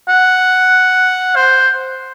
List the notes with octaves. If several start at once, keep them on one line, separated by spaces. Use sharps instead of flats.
F#5
C5